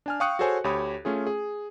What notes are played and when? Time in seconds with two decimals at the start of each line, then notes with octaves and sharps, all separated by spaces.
0.06 D4 G#5 F6
0.20 F5 G5 C#6 D#6 F#6 C#7
0.39 F#4 G#4 A4 C5 C#5 G#5
0.64 D2 G4 C#5 B5 D#6
1.05 A3 C#4 F4 G#4
1.27 G#4